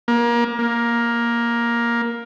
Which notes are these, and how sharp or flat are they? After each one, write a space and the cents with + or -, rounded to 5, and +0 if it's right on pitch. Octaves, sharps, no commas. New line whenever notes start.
A#3 +25
A#3 +10